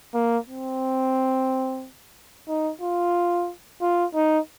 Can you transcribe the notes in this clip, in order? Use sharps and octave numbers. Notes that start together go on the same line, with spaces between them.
A#3
C4
D#4
F4
F4
D#4